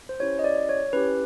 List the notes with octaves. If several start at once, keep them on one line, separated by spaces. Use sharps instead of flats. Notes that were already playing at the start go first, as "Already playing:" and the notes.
C5
C#4 E4 G4 C#5
D#5
D5
C#5
C#4 E4 G4 B4